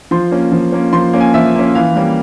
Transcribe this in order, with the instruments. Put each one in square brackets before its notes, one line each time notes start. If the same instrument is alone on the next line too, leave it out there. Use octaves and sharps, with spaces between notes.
[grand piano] F3 C6
A#3 C#4
F3
A#3 C#4
F3 C6
A#3 C#4
G#5
F3 E5
A#3 C#4
E3 F5
G3 A#3 C#4